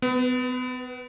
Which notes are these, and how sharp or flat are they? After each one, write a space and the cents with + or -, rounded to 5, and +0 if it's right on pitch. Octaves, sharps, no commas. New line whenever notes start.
B3 +35 B4 +0